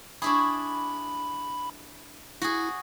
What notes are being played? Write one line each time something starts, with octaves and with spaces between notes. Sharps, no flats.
D4 E4 G#4 B5 C#6
E4 F#4 G#4